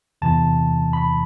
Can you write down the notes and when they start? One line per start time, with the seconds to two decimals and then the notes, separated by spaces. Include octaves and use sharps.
0.22 E2 C3 E3 A5
0.93 B5